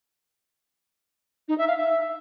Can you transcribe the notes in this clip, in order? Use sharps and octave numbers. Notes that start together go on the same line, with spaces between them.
D#4
E5
F5
E5